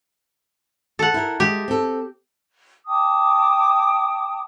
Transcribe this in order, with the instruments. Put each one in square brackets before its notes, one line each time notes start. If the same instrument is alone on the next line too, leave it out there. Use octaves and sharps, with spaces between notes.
[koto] A4 F#5
[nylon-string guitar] E4 A#4
[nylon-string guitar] G#3 [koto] G4
[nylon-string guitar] C4 A4
[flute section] G5 A5 D6 D#6